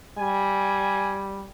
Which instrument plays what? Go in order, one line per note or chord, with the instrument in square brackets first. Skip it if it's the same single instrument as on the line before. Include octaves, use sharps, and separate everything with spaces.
[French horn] G3 [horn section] G#5